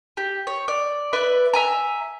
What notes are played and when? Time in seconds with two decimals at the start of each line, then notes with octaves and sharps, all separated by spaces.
0.17 G4
0.47 C#5
0.68 D5
1.13 B4 D5 E5
1.53 E5 G#5 A#5